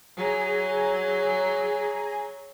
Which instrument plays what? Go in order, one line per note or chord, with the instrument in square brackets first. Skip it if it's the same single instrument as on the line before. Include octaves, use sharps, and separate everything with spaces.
[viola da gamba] F#3 [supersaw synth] G#4 G#5 A#5